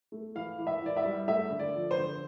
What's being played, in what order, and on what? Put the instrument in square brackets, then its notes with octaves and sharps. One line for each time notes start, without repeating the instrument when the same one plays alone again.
[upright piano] A3
E3 F5
E3
E5
E3 D5
E5
G3
A3 E5
D3
D5
F3
C5
D3